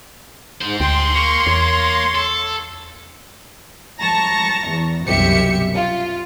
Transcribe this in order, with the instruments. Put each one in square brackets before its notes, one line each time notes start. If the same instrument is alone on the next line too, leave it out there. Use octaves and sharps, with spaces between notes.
[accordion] G#2 [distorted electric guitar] G#3 C5
[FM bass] D2 [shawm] G5 [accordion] C6
[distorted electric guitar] A#3 [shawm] C#6
[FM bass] E2 [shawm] C#5
[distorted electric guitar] A4
[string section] A5 A#5 C#6 A#6
E2
C2 F#2 B2 G4 E5 C#7
F4